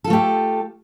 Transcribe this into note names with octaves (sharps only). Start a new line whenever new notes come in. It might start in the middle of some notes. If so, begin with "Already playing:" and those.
A3 F4 G4 A4